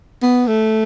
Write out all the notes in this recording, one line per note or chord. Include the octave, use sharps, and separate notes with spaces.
B3
A3